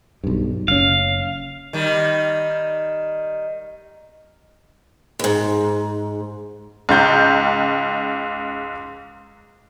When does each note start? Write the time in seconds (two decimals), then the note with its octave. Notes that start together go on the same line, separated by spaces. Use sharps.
0.24 B1 G2
0.68 F#1 C#4 F5
1.73 D#3 G3
5.19 D#2 G#2
6.89 C#2 G#2 G6